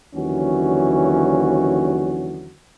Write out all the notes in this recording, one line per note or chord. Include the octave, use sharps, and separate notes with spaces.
D#2 D3 E3 F#3 C#4 F#4